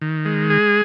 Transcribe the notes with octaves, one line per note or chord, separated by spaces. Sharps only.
D#3
G#3
G#4